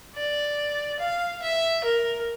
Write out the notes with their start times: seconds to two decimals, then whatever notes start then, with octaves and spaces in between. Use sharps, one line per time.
0.16 D5
1.00 F5
1.42 E5
1.84 A#4